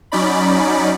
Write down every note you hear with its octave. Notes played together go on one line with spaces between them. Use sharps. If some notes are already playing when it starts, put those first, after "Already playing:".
F#3 C#4 D#4 D5 B5